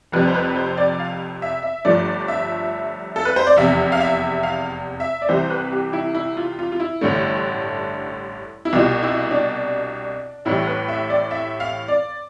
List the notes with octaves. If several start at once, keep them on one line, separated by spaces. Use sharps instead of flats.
F1 F2 C3 G3 B4
C5
B4
C5
D5
F5
E5
E5
G1 G2 F3 A3 D5
E5
A4
B4
C5
D5
F1 E2 C3 E5
F5
E5
F5
E5
D5
C2 C3 E3 G3 C5
B4
G4
E4
E4
F4
F4
F4
E4
A1 G2 D3 A3
E4
C2 B2 G3 F4
E4
D4
A1 A2 E3 G3 E4
B4
E5
D5
E5
F5
D5